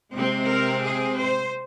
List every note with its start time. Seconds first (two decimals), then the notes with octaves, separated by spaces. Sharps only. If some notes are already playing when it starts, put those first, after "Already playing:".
0.14 C3 G#3 C4
0.48 A#4
0.83 G#4
1.18 C5